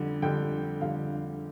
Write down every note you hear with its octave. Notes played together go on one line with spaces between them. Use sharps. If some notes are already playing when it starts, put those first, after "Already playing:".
Already playing: F2 D3 G3
F2 D3 G3 G5
F2 D3 G3 F5